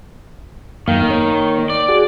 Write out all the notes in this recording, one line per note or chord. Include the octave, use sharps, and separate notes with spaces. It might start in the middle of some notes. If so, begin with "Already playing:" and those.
F#2 D#3 A#3 F5
A#3 C#5
D5
F#4 G#4